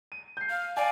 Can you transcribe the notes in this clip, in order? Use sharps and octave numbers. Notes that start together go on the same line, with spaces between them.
D#7
G6 C7
F5
D5 F5 G#5